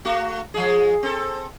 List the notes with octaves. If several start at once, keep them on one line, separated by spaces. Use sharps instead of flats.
A3 F#4
F3 G#3 G#4
C4 A4